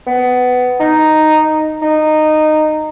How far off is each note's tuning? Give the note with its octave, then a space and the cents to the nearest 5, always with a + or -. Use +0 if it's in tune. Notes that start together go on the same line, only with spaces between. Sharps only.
B3 +15
D#4 -5
D#4 -15